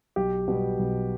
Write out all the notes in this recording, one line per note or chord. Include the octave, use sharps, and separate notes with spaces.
B1 G4
B2 G3 B3
B1